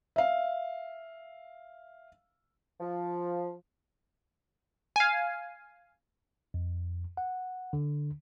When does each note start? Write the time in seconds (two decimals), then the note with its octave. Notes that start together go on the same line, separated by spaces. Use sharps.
0.16 E5 F5
2.80 F3
4.96 F5 G#5
6.54 F2
7.17 F#5
7.73 D3